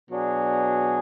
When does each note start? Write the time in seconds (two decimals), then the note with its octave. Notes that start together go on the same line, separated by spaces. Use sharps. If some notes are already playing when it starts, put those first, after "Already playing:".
0.10 B2 F#3 D4 G#4